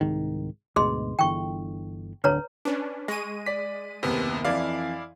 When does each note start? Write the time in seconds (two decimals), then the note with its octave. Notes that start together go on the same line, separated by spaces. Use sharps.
0.01 C2 G#2 D#3
0.76 D2 G#2 B2 G#4 D#5 C6
1.19 G1 D3 E3 G5 C#6
2.24 D1 B1 D3 B4 C#5 A#5
2.65 C#4 D4 B4
3.08 G#3 C#6 A#6 D#7
3.46 D5 D6 B6
4.03 F#1 D#2 C3 B3
4.45 F2 E3 E4 D5 F5